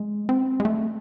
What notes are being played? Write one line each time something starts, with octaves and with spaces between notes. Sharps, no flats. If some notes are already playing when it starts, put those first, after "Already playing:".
Already playing: G#3
C4
G#3
A3